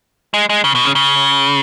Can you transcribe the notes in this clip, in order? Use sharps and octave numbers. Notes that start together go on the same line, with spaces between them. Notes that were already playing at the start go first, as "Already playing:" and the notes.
G#3
G#3
C#3
B2
C#3
C#3